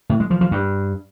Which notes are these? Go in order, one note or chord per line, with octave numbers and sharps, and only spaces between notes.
A2
G#3
F3
F3
G2